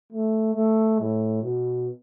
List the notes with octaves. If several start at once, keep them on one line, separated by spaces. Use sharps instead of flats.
A3
A3
A2
B2